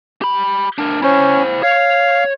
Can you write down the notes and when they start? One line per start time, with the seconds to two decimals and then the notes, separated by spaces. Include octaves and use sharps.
0.22 G4 B5
0.78 D4 A#4
1.02 C#4 E4 C5
1.63 C#5 F5